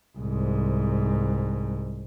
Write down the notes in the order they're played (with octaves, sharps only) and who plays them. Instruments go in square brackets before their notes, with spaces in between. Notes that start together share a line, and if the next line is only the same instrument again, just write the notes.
[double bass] C2 G#2